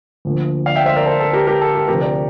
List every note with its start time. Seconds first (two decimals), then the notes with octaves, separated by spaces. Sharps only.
0.25 D2 D3 F3 A#3
0.66 D5 F5
0.76 E5 G5
0.86 C5 E5
0.96 A#4 D5
1.06 A4 C5
1.20 A4
1.33 G4 A#4
1.47 G4 A#4
1.61 A4
1.75 G4
1.88 D2 C3 F3 G4 A#4
2.01 A#4 D5